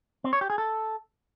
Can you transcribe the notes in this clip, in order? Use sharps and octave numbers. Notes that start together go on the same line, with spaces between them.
C4
C#5
G4
G#4
A4